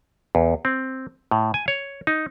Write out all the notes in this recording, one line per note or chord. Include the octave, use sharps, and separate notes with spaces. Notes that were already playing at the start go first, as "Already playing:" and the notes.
E2
C4
A2
G#5
C#5
D#4